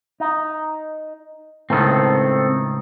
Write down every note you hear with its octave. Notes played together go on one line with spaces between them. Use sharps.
D#4
C#2 A2 D#3 C4 A4